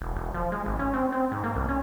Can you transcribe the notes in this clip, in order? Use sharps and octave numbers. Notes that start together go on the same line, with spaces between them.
E1
E1
F3
G#3
G#1
C#4
C4
C4
G#2
A#3
C2
C#4